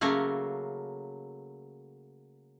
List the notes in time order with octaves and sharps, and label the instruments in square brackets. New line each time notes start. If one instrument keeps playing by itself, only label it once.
[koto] C#3 F#3 A3 A#3